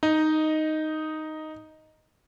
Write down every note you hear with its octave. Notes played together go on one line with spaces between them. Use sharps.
D#4 D#5